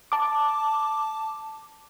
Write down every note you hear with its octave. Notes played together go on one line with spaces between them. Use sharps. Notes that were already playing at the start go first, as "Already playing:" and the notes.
A5 D6